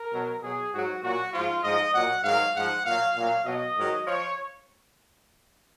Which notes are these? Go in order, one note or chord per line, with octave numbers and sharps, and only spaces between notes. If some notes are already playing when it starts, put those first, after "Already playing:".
Already playing: A#4
B2 F#3
B2 F#3 G#4
G#2 F#3 F#4
A#2 F#3 F#4
G#2 F3 F4
G#2 F3 D#5
A#2 F#3 F#5
G#2 D#3 F#3 F5
G#2 F3 F#5
A#2 F#3 F5
A#2 F#3 F5
B2 F#3 D#5
G#2 D#3 F#3
F3 C#5